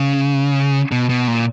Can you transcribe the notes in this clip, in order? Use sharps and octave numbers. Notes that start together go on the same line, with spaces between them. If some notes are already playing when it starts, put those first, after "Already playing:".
Already playing: C#3
B2
B2
A#2